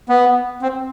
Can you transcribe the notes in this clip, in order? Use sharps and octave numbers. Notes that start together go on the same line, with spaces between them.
B3
C4